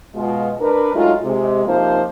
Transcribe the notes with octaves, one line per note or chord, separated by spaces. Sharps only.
B2 G#3 F4
D4 A#4 B4
F#3 G#3 A3 D#4 F4
C3 G#3
C3 F3 A#3 D#4 F4 C5